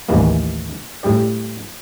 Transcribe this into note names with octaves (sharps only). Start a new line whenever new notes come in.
A1 D#2 D#3 E3 G3 A#3
A2 G3 G4 D5